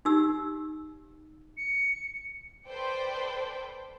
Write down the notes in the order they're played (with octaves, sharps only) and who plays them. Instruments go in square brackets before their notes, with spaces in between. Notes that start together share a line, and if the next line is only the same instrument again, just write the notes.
[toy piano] D#4 G4 E6
[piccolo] C#7
[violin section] A4 B4 C5 D5 G5